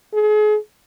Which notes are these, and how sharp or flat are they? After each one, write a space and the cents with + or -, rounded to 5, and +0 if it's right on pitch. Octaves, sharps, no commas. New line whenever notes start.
G#4 +35